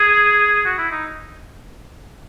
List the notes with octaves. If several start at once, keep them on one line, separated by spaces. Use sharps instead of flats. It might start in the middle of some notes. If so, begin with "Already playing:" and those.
Already playing: G#4
F#4
E4
D#4